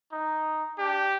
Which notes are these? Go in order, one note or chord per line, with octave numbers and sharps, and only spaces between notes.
D#4
D4 G4